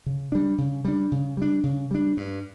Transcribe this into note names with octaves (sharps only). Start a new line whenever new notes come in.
C#3
G3 D4
C#3
G3 D4
C#3
G3 D4
C#3
G3 D4
G2